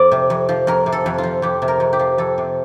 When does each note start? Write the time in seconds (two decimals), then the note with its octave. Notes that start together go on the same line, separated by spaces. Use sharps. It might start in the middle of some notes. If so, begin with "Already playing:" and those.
Already playing: F2 F3 C5 D5
0.11 C3
0.30 F2
0.49 F3
0.67 F2 A#4
0.86 C3
0.92 A4
1.06 F2
1.18 F4
1.23 F3
1.42 F2 G4
1.62 C3
1.68 A#4
1.80 F2
1.93 G4
1.99 F3
2.18 F2 A4
2.38 C3